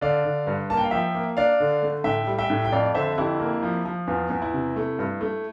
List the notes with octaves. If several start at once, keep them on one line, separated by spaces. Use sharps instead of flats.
D3 D5 F5
D3
G2
A#3 A5
G5
F5
F3 E5 G5
A#3
D4 D5 F5
D3
A3
A2 E5 G5
G3
E5 G5
A2
G5
F2 D5 F5
D3 C5 E5
F2 E4 G4
A#3
F3
F3
E2 F4
E2
E4
C3
A3
G2
A3